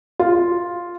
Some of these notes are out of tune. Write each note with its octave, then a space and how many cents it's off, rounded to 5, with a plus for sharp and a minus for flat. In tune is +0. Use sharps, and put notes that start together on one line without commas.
F4 +0